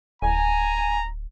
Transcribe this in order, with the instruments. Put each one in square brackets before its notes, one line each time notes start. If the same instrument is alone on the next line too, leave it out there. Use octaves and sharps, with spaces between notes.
[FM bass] D1 [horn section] G#5 [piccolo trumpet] A#5